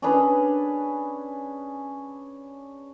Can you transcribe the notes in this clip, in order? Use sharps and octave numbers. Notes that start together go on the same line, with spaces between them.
C#4 D4 G#4 B4